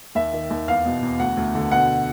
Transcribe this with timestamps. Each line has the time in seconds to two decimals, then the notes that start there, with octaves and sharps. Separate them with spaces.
0.15 D#2 E5
0.33 D#3
0.50 D#2
0.68 E2 F5
0.86 B2
1.03 E2
1.19 D2 F#5
1.37 D2
1.55 D3
1.71 B2 F#5